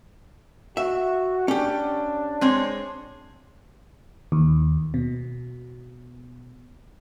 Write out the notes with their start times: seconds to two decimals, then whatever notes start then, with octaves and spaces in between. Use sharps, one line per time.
0.77 F#4 E5
1.48 C#4 D4 G4
2.41 G#3 C4 C#5
4.32 D#2
4.94 B2